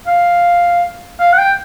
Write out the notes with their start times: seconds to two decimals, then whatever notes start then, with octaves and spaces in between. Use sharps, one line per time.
0.07 F5
1.20 F5
1.33 F#5
1.38 G5